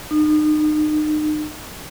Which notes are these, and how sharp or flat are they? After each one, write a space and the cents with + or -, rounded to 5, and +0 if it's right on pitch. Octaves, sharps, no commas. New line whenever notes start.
D#4 -35